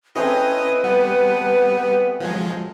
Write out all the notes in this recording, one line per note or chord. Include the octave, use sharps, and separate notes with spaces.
A3 C4 C#4 E4 G#4 B4 D#5
G3 B3
F3 F#3 G#3